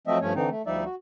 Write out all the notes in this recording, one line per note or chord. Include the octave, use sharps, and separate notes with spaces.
F3 F#3 A3 C4 D#5 E5
G2 F3 A3 C#4 C#5
D3 E3 C4 D#4
A3
D2 F3 G3 D#4 D5 E5
F#4